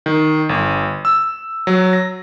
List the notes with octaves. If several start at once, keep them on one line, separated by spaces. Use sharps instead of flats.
D#3
G1
E6
F#3
A#6